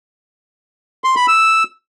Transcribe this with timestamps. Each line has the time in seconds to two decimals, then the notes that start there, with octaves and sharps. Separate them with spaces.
1.04 C6
1.16 B5
1.28 E6